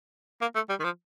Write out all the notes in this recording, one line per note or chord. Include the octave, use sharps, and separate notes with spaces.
A#3
A3
G3
D#3
F3